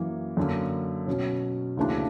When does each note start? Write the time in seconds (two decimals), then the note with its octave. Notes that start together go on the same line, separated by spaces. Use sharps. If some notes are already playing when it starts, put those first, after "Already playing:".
Already playing: F#2 E3 A#3
0.37 F#2 D3 A#3
1.07 B2 F#3 C#4
1.77 D2 C#3 E3 A#3 D4